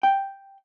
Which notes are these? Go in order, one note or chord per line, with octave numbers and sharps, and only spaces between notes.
G5